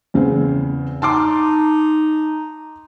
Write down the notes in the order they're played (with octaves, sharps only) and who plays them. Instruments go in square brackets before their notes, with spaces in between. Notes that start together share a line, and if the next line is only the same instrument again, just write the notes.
[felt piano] E2 C#3 C4
[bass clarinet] D#4 [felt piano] A5 C6 D6